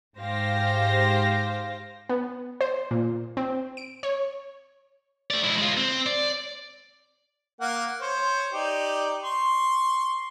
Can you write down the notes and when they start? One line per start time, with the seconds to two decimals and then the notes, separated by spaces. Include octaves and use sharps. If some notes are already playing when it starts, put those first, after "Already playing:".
0.19 G#2 G4 C5 F5 G5 A#6
2.09 B3
2.61 C5
2.91 A#2
3.37 C4
3.77 D7
4.03 C#5
5.31 A3 D5
5.44 G#3 E4
5.58 G#3 F4
5.77 C4
6.06 D5
7.60 A#3 F#5
8.01 C5 C#5
8.53 D#4 G4 D5
9.23 C6 C#6